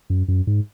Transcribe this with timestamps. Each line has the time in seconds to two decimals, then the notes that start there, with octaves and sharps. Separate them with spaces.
0.10 F#2
0.28 F#2
0.47 G#2